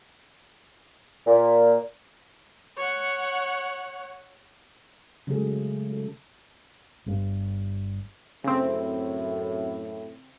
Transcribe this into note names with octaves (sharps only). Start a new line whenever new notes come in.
A#2
C#5 F#5
C#3 F#3 G#3 A3 G#4 A4
A4
G1 G2
F#2 A2 C#3 C4